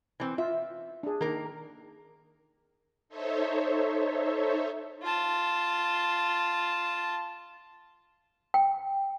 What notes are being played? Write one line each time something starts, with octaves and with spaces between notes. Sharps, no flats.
E3 C4
F4 E5
D4 G#4
D#3 A#3 A#4
D#4 A4 C5 C#5 E5
F4 A5
G5